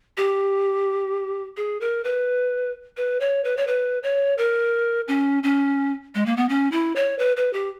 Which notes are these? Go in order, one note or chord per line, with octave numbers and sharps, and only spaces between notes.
G4
G#4
A#4
B4
B4
C#5
B4
C#5
B4
C#5
A#4
C#4
C#4
G#3
A#3
B3
C#4
E4
C#5
B4
B4
G4